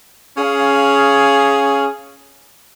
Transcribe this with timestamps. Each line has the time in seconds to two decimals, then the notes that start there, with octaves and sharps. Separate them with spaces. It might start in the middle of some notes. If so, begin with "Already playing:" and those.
0.38 C#4 G#4 F5